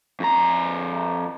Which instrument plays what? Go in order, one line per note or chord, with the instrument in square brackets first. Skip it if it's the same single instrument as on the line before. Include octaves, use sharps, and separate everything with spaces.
[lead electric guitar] F2 A#5